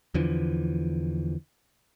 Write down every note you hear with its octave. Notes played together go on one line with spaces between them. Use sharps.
E2 D3 E3 F3